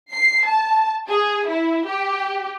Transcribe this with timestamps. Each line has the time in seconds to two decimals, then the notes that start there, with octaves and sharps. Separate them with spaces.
0.12 C7
0.45 A5
1.08 G#4
1.47 E4
1.86 G4